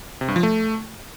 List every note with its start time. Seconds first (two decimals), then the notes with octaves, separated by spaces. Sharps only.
0.21 C3
0.28 G2
0.36 F3
0.43 A3